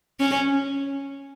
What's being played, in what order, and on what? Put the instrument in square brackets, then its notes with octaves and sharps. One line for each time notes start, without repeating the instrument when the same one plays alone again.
[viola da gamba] C#4